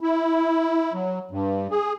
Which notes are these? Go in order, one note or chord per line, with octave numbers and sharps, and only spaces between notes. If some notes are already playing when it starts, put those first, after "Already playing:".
E4
F#3
G2
G#4